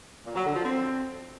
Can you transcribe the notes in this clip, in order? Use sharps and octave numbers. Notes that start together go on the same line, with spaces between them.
A#2
F#3
D3
F3
C4